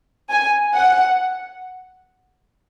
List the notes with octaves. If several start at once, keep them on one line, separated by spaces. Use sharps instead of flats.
G#5
F#5